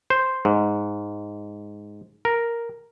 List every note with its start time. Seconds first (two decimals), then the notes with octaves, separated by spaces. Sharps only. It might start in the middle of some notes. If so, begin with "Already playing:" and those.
0.10 C5
0.45 G#2
2.25 A#4